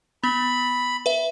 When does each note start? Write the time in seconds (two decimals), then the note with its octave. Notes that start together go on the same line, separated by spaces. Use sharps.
0.24 B3 B5
1.06 B4 E5